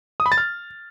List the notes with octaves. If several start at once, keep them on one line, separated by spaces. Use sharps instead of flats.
D#6
B5
A6
F6